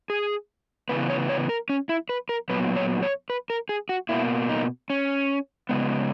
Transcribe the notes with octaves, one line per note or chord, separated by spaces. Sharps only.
G#4
C#3 E3 B3 B4
C#5
C#5
A#4
C#4
E4
B4
A#4
A#2 F#3 B3 B4
C#5
C#5
B4
A#4
G#4
F#4
B2 A#3 E4
D#4
C#4
C#3 G#3 B3